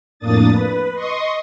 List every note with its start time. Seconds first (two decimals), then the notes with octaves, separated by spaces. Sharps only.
0.19 F2 A2 A#3 D4 D#6 A6
0.51 B4
0.94 D#5 C6 C#6 D#6